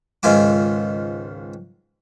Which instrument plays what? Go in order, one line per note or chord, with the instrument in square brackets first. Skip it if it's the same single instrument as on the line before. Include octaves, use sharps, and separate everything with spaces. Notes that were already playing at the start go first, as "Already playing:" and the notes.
[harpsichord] C#2 G#2 D#3 F4 G#5 D6